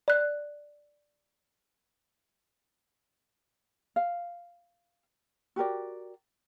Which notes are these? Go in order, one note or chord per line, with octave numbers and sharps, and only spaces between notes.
D5 F#6
F5
F#4 G4 A#4 D5